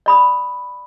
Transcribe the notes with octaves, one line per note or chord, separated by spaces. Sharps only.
D5 B5 D#6